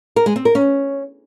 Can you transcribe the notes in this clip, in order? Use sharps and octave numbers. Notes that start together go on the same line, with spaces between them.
A#4
G#3
C4
A#4
C#4